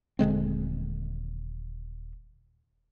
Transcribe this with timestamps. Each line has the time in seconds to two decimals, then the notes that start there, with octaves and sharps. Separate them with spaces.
0.19 D#1 D3 G#3 C4